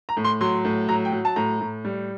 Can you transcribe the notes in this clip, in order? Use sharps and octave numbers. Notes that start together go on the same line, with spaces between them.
A#5
A2
C6
F#3 C6
A2
F#3 A#5
G5
F#3
A5
A2 A#5
A2
G3